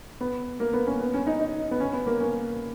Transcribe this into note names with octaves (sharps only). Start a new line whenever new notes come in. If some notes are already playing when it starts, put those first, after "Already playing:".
B3
A#3
B3
C#4
B3
C#4
D#4
D#4
B3
C#4
B3
A#3
C#4